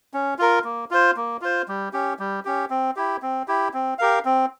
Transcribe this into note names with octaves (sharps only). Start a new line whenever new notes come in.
C#4
F4 A#4
A#3
F4 C5
A#3
F4 C5
G3
C#4 G4
G3
C#4 G4
C4
E4 G4
C4
E4 G4
C4
G4 A#4 F5
C4